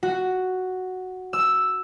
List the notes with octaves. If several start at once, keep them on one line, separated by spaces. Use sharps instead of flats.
F#4
E6